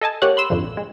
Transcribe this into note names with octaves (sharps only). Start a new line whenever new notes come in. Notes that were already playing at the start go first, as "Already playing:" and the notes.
A4 D#5 G#5 A5
A#3 G4 C#5 F#5
B5 C6 E6
F2 G#2 D3 F3
A#1
G#3